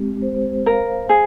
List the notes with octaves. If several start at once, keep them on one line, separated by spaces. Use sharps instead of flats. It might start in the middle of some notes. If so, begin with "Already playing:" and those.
Already playing: G#3 C4 G4
C5
A#4 F5
G#4 C5